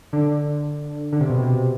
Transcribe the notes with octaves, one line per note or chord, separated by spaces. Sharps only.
D3
D3
C3
B2
C3